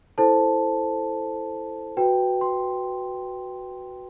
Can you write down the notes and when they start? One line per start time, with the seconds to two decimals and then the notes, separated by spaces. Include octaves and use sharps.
0.18 E4 A4 C5 A5
1.97 F#4 B4 G5
2.41 C6